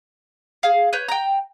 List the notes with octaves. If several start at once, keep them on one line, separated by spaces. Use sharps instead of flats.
G#4 F5
B4 C#5 G6
G5 A#5